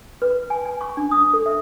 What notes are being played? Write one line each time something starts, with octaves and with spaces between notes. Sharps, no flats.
B4
G#5
G#5
C#6
D4
D#6
A4
E5